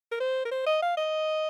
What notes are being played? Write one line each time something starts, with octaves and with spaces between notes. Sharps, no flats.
A#4
C5
A#4
C5
D#5
F5
D#5